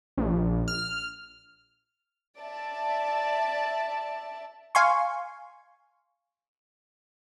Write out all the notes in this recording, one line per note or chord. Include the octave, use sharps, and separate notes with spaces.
A#1
F6
D5 E5 A5
F5 G#5 C6 C#6